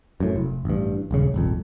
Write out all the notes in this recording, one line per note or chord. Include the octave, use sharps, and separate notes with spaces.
F#2 A2
F1
A1 G2
D#1 C#2 C#3
D#1 G#1 F2